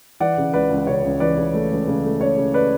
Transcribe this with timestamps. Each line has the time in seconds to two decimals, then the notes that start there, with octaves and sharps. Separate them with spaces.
0.20 E3 D5 F#5
0.37 C#3
0.54 C#2 B4 D5
0.70 C#2
0.78 B4
0.87 C#3 C#5
1.04 C#2
1.20 E3 B4 D5
1.37 C#3
1.54 A3
1.71 C#2
1.88 C#3
2.04 A3
2.21 C#3 C#5
2.37 C#3
2.54 B4 D5